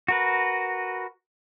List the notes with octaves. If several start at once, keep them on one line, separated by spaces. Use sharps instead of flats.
F#4 A#4 B4